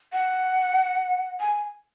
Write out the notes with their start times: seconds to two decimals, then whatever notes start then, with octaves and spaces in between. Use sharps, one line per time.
0.13 F#5
1.41 G#5